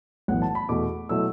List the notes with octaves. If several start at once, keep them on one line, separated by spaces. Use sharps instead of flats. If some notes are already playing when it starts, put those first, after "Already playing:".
B1 A2 E3 B3 E4 F#5
A5
B5
E2 B2 A3 D6
B2 F#3 A3 E4 E6